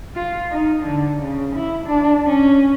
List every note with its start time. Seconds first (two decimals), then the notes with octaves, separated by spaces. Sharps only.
0.15 F4
0.51 D#4
0.84 D3
1.21 C#3
1.56 E4
1.87 D4
2.27 C#4